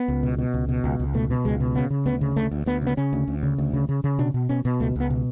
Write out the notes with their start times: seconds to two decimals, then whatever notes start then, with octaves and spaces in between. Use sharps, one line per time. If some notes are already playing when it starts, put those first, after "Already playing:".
Already playing: B3
0.08 C#2
0.23 B2
0.38 B2
0.54 C#2
0.69 B2
0.84 C#2
1.00 C#2
1.14 B2 A3
1.30 B2
1.45 C#2 G#3
1.60 B2
1.75 C#3 B3
1.90 C#3
2.06 D2 B3
2.21 C#3
2.36 D2 A3
2.51 D2
2.66 D2 B3
2.82 C#3 B3
2.97 C#3 C#4
3.13 D2
3.28 D2
3.43 C#3
3.58 D2
3.74 C#3
3.89 C#3
4.04 C#3
4.19 B2 D4
4.34 B2
4.49 B2 C#4
4.65 B2
4.80 C#2 A3
4.95 C#2 B3
5.10 B2